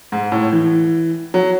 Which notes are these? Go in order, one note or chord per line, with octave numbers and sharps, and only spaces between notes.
G#2
A2
E3
F#3